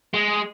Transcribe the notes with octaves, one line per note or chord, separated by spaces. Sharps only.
G#3